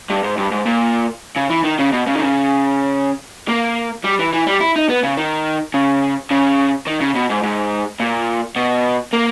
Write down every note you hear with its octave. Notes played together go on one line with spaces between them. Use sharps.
G2
G#2
G2
G#2
A#2
C#3
E3
D#3
C#3
B2
C#3
D#3
C#3
A#3
G3
E3
E3
G3
E4
D#4
B3
C#3
D#3
C#3
C#3
D#3
C#3
B2
G#2
G#2
A#2
B2
A#3